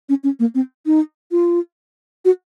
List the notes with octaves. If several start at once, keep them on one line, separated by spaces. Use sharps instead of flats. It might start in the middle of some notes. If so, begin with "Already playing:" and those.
C#4
C#4
A#3
C4
D#4
F4
F#4